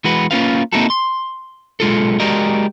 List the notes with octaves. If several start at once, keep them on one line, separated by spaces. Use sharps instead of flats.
E3 G#3 F#4 B4
A#3 C4 C#4 F4 B4 F5
A#3 C4 D#4 E4 F#4 A4
C6
B1 G#3 F4 A4
G#3 F#4 G4 A#4 D5 D#5